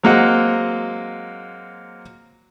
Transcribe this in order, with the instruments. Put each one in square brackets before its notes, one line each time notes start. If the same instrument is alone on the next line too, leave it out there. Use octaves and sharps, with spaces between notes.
[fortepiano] F#3 G#3 A#3 C4 D#5 F#5